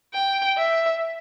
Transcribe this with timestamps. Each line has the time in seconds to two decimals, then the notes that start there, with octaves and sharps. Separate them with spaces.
0.14 G5
0.58 E5